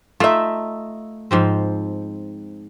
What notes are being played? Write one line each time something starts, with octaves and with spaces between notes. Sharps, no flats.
A3 D#4 F4 E5
G#2 F3 C4